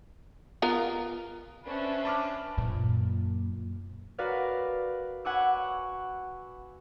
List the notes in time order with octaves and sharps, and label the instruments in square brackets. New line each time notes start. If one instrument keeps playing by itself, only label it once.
[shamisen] B3 F4 A#4
[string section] C#4 D4 [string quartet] B4 C5 E5
[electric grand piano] A5 D6 F6
[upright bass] F#2 A#2
[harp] F#4 A#4 B4 D5 F5
F#5 G#5 B5 C#6 D6 E6